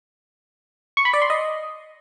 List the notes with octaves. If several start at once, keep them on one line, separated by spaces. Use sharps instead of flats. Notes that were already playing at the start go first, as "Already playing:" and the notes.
C#6
B5
D5
C6
D#5